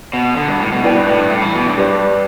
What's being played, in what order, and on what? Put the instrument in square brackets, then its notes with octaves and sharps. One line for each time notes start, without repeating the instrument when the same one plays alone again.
[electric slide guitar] B2
D3
G2
A2
B2
[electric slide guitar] B2 [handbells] E4 B4 D5 G5
[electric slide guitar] G2
A2
G2
A2
E3
B2
G2
[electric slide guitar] G2 [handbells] G4 B4 D5